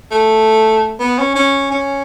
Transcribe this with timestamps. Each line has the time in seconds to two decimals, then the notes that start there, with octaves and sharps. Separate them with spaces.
0.11 A3
0.99 B3
1.18 C#4
1.35 C#4
1.71 C#4